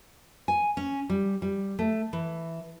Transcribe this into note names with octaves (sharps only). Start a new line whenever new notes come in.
G#5
C#4
G3
G3
A3
E3